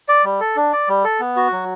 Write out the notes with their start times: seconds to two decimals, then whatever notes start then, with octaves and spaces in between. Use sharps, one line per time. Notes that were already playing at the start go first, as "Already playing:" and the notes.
0.08 D5
0.24 G3
0.40 A4
0.56 D4
0.72 D5
0.88 G3
1.04 A4
1.20 B3
1.36 F#4
1.52 F#3